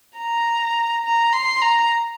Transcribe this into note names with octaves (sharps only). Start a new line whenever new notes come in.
A#5
A#5
C6
A#5